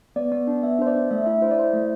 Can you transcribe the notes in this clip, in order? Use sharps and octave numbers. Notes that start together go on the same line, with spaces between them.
B3 D5
B3 D5
D4
B3 E5
D4 C5
D5
D4
A3 E5
E4 E5
E4 C5
D5
E4 C5
A3